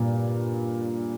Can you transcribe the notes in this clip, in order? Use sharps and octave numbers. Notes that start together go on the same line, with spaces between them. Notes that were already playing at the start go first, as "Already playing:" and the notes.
Already playing: G2 A#2